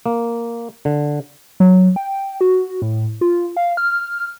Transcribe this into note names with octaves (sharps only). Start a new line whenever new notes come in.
A#3
D3
F#3
G5
F#4
A2
F4
F5
F6